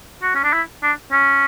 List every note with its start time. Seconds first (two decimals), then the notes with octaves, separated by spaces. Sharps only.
0.22 F#4
0.35 C#4
0.43 D4
0.53 E4
0.83 D4
1.12 C#4